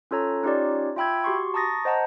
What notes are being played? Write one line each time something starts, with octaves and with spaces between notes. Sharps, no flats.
C#4 F4 A4 C#5 A#5
C#4 D#4 F4 G4 C#5 D5
F4 E5 G5 B5 E6 G#6
F#4 G4 C6 C#6
A5 A#5 C#6 D#6 A6 A#6
C5 D#5 F#5 A5 A#5